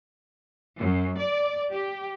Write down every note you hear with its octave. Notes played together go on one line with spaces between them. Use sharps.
F#2
D5
G4